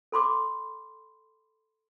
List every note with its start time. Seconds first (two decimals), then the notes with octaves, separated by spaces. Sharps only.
0.12 A4 B5 C6 D6